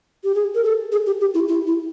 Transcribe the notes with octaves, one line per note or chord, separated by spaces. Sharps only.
G4
G#4
A#4
A4
G#4
G4
G4
E4
E4
E4